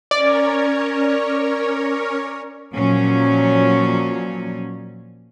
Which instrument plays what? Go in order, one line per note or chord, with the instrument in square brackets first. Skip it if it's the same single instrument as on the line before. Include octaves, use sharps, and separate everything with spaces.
[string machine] C#4 A#4 C#5 [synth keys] D5
[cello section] A#2 F3 F#3 C#4